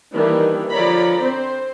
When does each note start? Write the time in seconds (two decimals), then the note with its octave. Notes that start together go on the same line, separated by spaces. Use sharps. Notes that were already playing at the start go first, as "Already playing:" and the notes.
0.15 D#3 E3 G3 A#3 D4
0.72 D3 F3 C#5 D5 A#5 B5
1.20 C4 C5